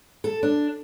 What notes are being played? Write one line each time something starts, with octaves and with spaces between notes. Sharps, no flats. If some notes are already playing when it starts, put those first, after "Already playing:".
A4
D4